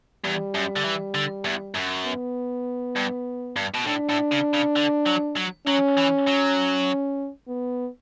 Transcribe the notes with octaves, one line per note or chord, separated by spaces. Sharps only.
E2 G3
F#2
D3
E3
D3
E2
F#2
B3
G2
G2
B2
A2 D4
A2
C#3
C#3
D3
F#3
F#3
F#3 C#4
E3
F#3
B3